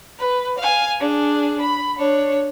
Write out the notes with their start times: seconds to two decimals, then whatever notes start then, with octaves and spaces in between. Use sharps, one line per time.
0.19 B4
0.58 F5 G#5
1.00 D4 G#4
1.61 B5
1.98 D4 C#5